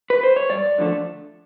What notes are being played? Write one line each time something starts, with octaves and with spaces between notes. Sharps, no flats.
B4
C5
C#5
G2 D5
D3 F3 A3 D4